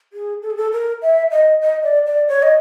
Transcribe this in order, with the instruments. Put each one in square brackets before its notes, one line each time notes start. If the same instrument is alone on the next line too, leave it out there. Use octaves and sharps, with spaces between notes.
[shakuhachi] G#4
A4
G#4
A4
A#4
E5
D#5
D#5
D5
D5
C#5
D#5